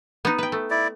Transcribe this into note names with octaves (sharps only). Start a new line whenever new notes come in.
B3 D#4
B4 G5
A3
E4 D5